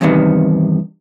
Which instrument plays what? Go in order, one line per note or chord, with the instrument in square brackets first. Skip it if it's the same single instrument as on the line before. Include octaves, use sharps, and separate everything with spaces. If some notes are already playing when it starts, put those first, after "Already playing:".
[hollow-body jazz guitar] E2 G2 C3 D#3 B3